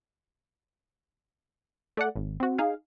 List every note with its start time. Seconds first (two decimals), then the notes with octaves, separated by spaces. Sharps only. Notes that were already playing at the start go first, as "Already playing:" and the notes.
1.97 A3 D5 F#5
2.16 G#1
2.40 C4 F#4
2.58 D#4 G#4 F5